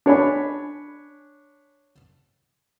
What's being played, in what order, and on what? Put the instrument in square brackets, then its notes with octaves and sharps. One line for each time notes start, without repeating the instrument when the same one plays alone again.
[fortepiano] D4 C#5 G#5 B5